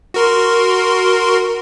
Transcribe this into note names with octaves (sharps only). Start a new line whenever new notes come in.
F#4 A#4 C6